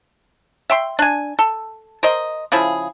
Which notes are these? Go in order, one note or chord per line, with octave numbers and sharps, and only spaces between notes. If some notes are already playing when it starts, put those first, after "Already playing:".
E5 G5 C6
D4 G#5
A4
A#4 C5 D#5
C#3 F3 E4 G#4